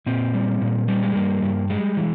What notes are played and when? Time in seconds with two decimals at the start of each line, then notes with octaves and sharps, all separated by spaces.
0.06 A#2 C4
0.34 G3
0.61 A#2
0.88 G3
1.03 G#3
1.16 G2 A#3
1.42 G2
1.70 G3 G#3
1.97 E3